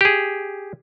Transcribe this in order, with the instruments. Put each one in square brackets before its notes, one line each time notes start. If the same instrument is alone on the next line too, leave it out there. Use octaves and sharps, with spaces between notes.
[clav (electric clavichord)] G4 G#4